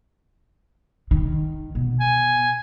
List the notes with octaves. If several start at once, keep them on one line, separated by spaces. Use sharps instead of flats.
D#3
B2
G#5